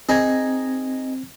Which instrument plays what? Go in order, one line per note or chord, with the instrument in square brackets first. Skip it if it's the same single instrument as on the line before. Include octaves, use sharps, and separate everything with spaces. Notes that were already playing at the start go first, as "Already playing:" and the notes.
[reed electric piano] C4 G#6 [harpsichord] D#4 G#4